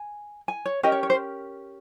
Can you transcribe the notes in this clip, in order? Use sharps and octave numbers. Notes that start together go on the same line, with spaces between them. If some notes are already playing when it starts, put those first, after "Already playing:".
Already playing: G#5
G#5
C#5
C#4 G4 A#4 D#5
C#5
C#5
C5